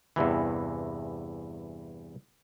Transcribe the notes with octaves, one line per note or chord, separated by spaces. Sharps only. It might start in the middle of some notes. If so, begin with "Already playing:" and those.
E2 G2 C3 E3